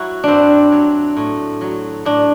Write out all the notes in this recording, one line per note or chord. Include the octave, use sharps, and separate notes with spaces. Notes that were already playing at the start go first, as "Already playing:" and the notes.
Already playing: F#3 E4 F#4
G2 C4 D4
F#3
A2
F#3
A2 D4